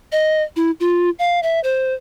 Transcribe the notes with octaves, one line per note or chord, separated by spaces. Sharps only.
D#5
E4
F4
F5
E5
C5